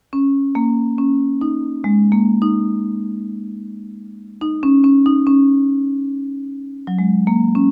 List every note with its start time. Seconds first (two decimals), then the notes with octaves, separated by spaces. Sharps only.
0.13 C#4
0.55 A#3
0.98 C#4
1.41 D#4
1.84 G#3
2.12 A#3
2.42 D#4
4.41 D#4
4.63 C#4
4.84 C#4
5.06 D#4
5.27 C#4
6.87 F#3
6.99 G#3
7.27 A#3
7.55 C#4